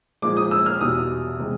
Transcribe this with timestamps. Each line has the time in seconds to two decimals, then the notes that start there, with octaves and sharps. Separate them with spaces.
0.22 A#2 F3 G#3 D6
0.37 D#6
0.51 E6
0.66 F6
0.81 E2 B2 G3 D#6
1.39 C3 E3 G#3